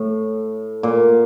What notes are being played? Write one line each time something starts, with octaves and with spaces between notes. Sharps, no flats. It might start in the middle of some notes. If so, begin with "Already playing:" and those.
Already playing: A2
A#2